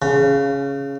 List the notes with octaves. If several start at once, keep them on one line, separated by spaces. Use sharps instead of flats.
C#3